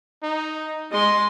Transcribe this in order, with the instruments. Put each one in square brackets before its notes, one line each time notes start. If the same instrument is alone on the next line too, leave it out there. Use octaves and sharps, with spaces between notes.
[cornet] D#4
[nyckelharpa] G#3 C6 [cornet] D#5